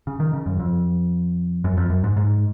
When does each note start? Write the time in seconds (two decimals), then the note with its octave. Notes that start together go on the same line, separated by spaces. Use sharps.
0.07 C#3
0.20 D#3
0.33 C#3
0.46 F#2
0.60 F2
1.64 F#2
1.77 F2
1.90 F#2
2.04 G#2
2.17 G#2